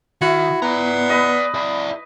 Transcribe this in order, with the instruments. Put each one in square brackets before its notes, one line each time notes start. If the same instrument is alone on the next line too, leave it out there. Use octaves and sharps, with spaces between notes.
[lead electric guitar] D#3 [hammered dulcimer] E4 [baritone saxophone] F#4
[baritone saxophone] B3 [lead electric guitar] D5 A#5
[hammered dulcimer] B4 D#5
[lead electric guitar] E4 D5